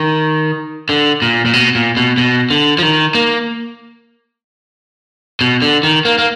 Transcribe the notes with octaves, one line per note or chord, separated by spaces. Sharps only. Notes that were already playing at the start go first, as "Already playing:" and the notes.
Already playing: D#3
D3
A#2
A#2
B2
A#2
B2
B2
D3
F3
D#3
A#3
B2
D3
D#3
A#3
A#3